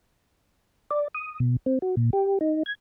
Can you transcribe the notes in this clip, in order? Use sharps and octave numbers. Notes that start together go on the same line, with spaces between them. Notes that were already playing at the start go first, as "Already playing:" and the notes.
D5
D#6
B2
C4
F#4
A#2
G4
D#4
G#6